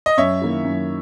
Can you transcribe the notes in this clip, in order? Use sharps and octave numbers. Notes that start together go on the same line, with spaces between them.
D#5
F#2 C#5 E5
D#3 A#3 E4
F#2